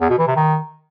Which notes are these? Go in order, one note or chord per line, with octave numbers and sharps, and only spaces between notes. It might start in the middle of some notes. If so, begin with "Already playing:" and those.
E2
B2
E3
C3
D#3